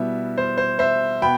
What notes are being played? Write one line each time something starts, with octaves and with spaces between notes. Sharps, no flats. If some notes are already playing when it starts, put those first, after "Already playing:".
Already playing: B2 G3 B3 E4 E5
C5
C5
C5 E5
B2 B3 G5 B5